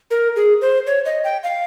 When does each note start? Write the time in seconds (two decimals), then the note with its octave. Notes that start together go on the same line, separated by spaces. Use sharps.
0.11 A#4
0.36 G#4
0.61 C5
0.87 C#5
1.05 D#5
1.24 G5
1.43 F5